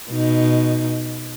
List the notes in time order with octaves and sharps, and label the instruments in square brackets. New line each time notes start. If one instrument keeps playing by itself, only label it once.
[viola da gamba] B2 D#4